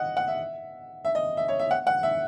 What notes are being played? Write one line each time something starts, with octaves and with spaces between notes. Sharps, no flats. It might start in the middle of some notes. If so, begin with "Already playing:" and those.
Already playing: D#5 F#5
F#5
E5
E5
D#5
E5
C#5
E5
F#5
F#5
E5